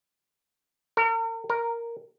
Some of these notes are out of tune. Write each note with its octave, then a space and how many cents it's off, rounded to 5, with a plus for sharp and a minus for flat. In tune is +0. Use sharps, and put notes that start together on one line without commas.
A#4 -40
A#4 +0